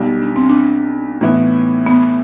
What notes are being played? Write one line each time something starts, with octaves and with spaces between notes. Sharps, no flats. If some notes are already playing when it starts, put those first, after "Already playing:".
Already playing: B1 B2 G3
D4
C4
D4
A2 E3 B3 E4
B3